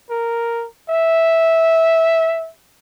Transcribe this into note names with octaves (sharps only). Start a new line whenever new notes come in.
A#4
E5